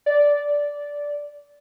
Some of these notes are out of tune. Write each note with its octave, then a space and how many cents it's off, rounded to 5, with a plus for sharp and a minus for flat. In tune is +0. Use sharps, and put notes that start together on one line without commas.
D5 -10